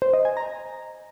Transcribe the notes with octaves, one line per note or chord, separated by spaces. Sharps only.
C5
D#5
G#5
A#5